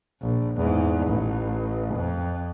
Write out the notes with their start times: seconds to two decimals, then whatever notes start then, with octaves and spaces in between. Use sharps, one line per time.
0.21 A#1
0.56 E2 G#2
1.07 A1
1.95 F2